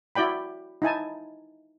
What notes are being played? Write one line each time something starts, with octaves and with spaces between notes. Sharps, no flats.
E4 F#4 D5 G5 B5
D#4 E4 G#5 A5